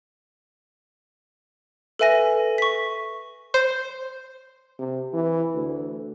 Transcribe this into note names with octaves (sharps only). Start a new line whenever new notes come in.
A4 B4 E5 G#5 A#6
C#6 B6
C5
C3
E3
D2